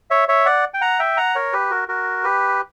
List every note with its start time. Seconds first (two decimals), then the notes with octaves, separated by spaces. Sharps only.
0.11 C#5 E5
0.28 C#5 E5
0.46 D5 F#5
0.74 G5
0.81 F#5 A#5
0.99 E5 G5
1.17 F#5 A#5
1.35 A#4 C#5
1.53 G4 B4
1.70 F#4 A#4
1.88 F#4 A#4
2.24 G4 B4